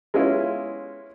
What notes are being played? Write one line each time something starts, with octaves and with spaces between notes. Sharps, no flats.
G#3 B3 C#4 E4 F4